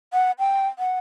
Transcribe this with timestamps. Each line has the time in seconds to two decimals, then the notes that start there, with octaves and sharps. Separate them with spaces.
0.13 F#5
0.39 G5
0.79 F#5